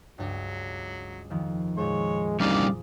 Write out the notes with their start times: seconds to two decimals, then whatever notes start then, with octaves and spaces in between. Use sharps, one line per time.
0.18 C#2 G2 F#3
1.30 F2 D#3 F3
1.77 F2 A#2 G#3 C#5
2.40 C2 G3 C#4 D#4 G#4 D5 F5